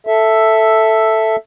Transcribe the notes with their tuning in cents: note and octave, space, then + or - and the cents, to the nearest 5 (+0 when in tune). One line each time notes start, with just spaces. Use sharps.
A4 +0 E5 +0